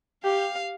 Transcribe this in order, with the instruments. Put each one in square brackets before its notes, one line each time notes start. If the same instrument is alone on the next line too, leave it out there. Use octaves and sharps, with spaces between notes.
[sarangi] G4 [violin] F5